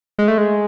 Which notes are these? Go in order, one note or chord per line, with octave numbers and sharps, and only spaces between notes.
G#3
A3
G#3